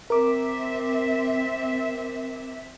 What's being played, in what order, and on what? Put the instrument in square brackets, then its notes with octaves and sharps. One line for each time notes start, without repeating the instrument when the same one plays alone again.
[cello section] C4 E5 [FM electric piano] A#4 D6